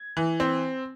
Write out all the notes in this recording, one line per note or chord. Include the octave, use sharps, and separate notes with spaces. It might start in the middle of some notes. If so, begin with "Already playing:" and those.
Already playing: G#6
E3
C4